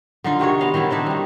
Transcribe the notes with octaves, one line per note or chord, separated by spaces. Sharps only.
D3 D#4 F4
C3 D#3 F#4 C#5
B3 D#5 F5
D#3 E3 A3 E4
C4 D4 D#4 E5
D#3 G3